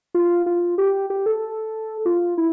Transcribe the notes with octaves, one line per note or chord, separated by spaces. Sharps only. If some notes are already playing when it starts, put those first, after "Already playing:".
F4
F4
G4
G4
A4
F4
E4